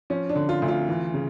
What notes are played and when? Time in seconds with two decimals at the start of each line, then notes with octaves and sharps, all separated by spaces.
0.10 F3 C#4
0.29 D4
0.36 D3
0.49 F4
0.62 D2
0.68 F4
0.88 E3
1.14 C#3